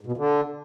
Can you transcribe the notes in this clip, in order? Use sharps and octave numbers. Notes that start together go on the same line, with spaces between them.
G#2
B2
F2
D3